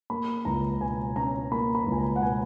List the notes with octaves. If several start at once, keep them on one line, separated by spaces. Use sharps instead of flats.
A#3 B5
C#2 A#5
B2 G#5
C#4 A#5
A#3 B5
B5
C#2
G#5
A#5
F#5
B2 G#5